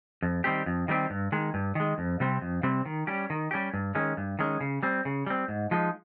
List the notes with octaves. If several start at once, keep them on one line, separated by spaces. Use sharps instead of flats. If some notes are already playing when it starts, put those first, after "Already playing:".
F2
D#3 G3 C4 G4
F2
D#3 G3 C4 G4
G2
D#3 G#3
G2
D#3 G#3
F2
C3 G3 C4
F2
C3 G3 C4
D#3
G3 C#4 G4
D#3
G3 C#4 G4
G2
D#3 G#3 C#4
G2
D#3 G#3 C#4
C#3
G3 C4
C#3
G3 C4
G#2
F3 G#3 D#4